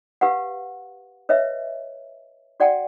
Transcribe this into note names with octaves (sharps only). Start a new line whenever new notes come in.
G4 B4 F5 F#5
B4 C#5 D#5 E5
F#4 D5 F#5 G5 A5